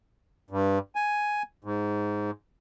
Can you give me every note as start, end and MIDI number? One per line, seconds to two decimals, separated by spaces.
0.50 0.79 43
0.95 1.43 80
1.64 2.31 44